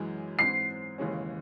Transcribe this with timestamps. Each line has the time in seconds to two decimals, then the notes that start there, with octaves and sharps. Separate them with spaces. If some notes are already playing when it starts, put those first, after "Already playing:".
Already playing: F#2 E3 G#3
0.39 G#2 E3 C4 C7
0.98 D#2 C#3 E3 G#3 C#4